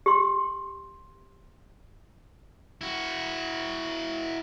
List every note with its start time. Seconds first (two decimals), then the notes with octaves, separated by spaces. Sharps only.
0.06 G4 C6
2.81 E4 F#4